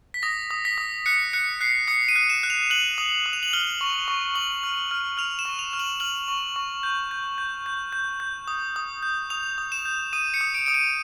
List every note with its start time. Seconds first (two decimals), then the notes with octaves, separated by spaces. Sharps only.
0.14 B6
0.23 D#6 A#6
0.51 D#6
0.65 B6
0.78 D#6
1.06 F#6 C#7
1.33 F#6 C#7
1.61 F#6 C7
1.88 D#6 C#7
2.08 D#7
2.16 F#6
2.30 E7
2.43 F#6
2.50 F7
2.70 F#6 F#7
2.98 D#6
3.26 D#6
3.33 F7
3.43 F#7
3.53 F6 G7
3.81 C#6
4.08 C#6
4.35 C#6 F#7
4.64 F6
4.91 F6
5.18 F6 F7
5.39 E7
5.45 C#6
5.59 F7
5.73 F6
5.79 F#7
6.00 F6 F#7
6.28 C#6
6.56 C#6
6.83 G6
7.11 G6
7.38 G6
7.66 G6
7.93 G6
8.20 G6
8.48 D#6
8.76 D#6
9.03 G6
9.30 D#6 F7
9.58 D#6
9.72 E7
9.85 G6
10.13 D#6 D#7
10.34 C#7
10.41 D#6
10.54 D7
10.66 D#6 D7
10.74 D#7